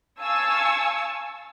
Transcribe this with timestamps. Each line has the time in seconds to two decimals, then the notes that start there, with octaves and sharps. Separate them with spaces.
0.21 F5 G#5 A5 C#6 E6